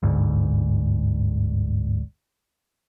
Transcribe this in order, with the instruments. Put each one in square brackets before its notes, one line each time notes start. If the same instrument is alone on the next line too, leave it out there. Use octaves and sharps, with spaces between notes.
[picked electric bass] G1 D2 G#2